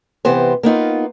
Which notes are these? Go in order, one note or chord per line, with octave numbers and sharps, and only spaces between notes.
C3 E3 B3 G4 C5
A#3 B3 D#4 F4